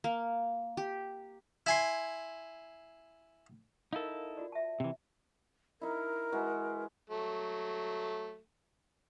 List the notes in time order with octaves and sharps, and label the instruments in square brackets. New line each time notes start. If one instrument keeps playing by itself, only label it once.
[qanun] A#3
G4
[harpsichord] E4 G#5 C6
[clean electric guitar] D#4 E4 A4 [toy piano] A#4 F5
[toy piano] F4 F#4 D5
E5 A5
[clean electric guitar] C3 E3
[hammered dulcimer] D#4 E4 [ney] A#4
[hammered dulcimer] E3 G#3 F#4
[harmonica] F#3 A3